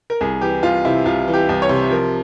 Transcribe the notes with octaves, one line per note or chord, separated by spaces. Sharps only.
A#4
C2 G#4
E3 G4
C2 F4
C3 E4
C2 F4
E3
G4
C2
C#5
C3
F3 A#4